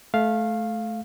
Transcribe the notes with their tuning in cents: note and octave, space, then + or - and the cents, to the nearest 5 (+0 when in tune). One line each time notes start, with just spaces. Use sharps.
A3 -20 F5 +0